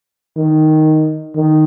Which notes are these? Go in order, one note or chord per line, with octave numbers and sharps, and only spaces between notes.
D#3
D#3